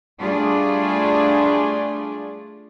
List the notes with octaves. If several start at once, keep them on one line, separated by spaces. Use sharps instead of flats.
G3 A3 D4 F4 G#4 D5